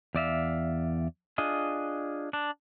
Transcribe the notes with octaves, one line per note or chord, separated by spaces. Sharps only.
E2 D5 E5 F5
D4 F4 G#4 D#5
D4